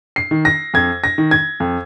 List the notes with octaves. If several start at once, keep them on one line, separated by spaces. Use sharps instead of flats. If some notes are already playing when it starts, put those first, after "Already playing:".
C7
D#3
A#6
F2 G#6
A#6
D#3
G#6
F2